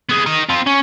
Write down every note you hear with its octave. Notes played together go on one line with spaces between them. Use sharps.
B3 G#4
A#4 D#5
C4 F4
C#4